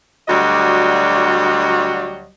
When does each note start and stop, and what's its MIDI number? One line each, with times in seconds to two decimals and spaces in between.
0.28 2.30 38
0.28 2.30 54
0.28 2.30 55
0.28 2.30 66
0.28 2.30 74
0.28 2.30 75